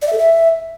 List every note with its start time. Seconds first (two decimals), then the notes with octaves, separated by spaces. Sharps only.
0.02 D5
0.07 E5
0.13 A4
0.18 E5